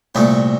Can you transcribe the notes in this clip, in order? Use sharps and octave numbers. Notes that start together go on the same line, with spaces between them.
C2 A#2 A3